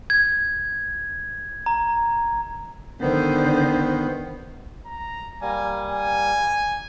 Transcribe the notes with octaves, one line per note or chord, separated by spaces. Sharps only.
G#6
A#5
D3 D#3 B3 C5
A#5
G3 A#3 G#5
G#5